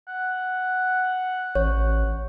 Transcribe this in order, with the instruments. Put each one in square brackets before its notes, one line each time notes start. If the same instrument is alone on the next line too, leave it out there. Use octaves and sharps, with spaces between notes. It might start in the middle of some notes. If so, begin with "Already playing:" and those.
[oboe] F#5
[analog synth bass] A1 [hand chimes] C#5